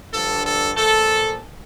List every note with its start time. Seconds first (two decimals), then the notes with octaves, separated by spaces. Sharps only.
0.12 G2 D3 F3 A4
0.44 A4
0.75 A#2 F3 A4